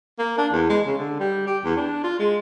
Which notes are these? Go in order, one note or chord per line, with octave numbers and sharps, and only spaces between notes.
A#3
D4
E2
G#3
C#3
D3
G3
G4
E2
D4
F4
G#3